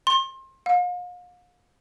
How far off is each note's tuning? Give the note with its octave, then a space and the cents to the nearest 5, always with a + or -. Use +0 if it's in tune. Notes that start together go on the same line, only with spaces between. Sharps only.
C6 +30
F5 +40